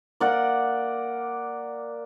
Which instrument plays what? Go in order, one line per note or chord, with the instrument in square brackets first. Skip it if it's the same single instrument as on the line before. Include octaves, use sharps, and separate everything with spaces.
[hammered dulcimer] A#3 D5 F#5